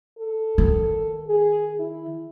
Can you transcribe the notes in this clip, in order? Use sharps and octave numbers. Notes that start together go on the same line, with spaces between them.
A4
D#3
G#4
E4